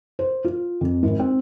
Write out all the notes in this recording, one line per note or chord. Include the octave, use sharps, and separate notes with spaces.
C5
F4
F2
G#1
C4